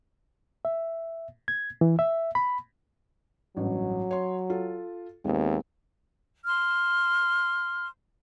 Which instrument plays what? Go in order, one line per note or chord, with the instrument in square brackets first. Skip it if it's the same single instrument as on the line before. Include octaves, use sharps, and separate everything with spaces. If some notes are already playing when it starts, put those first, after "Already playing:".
[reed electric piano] E5
G#6
E3
E5
B5
[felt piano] A1 G2 [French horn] F#3
[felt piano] C#5 C6
F4 A4
[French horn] D#2 [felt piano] G#3 B3 C4
[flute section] C6 F6